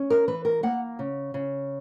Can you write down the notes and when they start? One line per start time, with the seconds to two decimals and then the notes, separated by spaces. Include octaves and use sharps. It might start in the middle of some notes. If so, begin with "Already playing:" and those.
Already playing: C#4
0.10 A#4
0.28 E3 B4
0.45 A#4
0.63 A#3 F#5
0.99 C#3
1.34 C#3